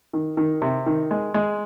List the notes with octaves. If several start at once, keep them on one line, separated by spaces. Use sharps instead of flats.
D#3
D#3
C3
D#3
G#3
G#3